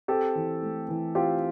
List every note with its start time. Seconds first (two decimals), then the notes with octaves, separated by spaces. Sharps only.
0.08 C4 G4 A4
0.35 E3
0.62 A3
0.88 E3
1.15 C4 F4 G4